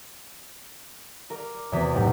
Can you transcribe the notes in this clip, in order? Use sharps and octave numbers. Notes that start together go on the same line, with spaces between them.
A#4 F5 D6
E2 C3 B3 E4 F#4 B6
B1 F#2 A2 G4 A#4 F#5